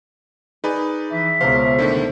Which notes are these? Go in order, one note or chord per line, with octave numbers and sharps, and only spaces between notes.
D#4 G#4 B4 D5
E3 E5
C#2 B2 C5 F5 A#5
D3 D#3 A3